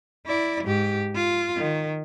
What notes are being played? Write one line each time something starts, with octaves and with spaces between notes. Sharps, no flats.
E4 D5
G#2 G4
F4
D#3